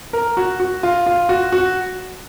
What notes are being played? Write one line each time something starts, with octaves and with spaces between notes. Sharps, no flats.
A#4
F#4
F#4
F4
F4
F#4
F#4